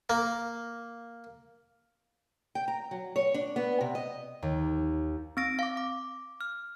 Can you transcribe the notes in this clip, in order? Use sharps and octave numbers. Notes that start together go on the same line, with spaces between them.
A#3
G5
A#5
F#3
C#5
D4
B3
C3
D#5
D#2
C4 E6 A#6 D7
F5 D6
D6
F6